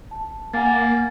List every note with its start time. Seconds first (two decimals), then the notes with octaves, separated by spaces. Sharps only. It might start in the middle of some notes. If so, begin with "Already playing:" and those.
0.11 A5
0.53 A#3 F#5 G#5 A6